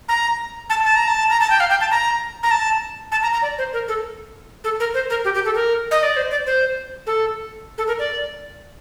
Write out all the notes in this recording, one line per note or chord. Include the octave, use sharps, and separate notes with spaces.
A#5
A5
A5
A#5
A5
A#5
A5
G5
F5
G5
A5
A#5
A#5
A5
A5
A#5
A#5
D5
C5
A#4
A4
A4
A#4
C5
A#4
G4
G4
A4
A#4
D#5
D5
C5
D5
C5
A4
A4
A#4
D5